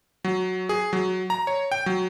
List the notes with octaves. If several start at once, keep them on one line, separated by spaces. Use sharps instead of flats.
F#3
G#4
F#3
A#5
C#5
G5
F#3